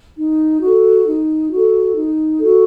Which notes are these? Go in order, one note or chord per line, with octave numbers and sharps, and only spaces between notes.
D#4
F#4 A4
D#4
F#4 A4
D#4
F#4 A4